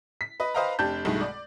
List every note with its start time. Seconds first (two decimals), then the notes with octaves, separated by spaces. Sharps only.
0.21 B6
0.40 B4 D#5
0.55 B4 C5 D#5 F5 G5 A#5
0.79 F1 D4 G4 A5 G6
1.05 B1 G2 B2 D#3 G#3 A3
1.21 D5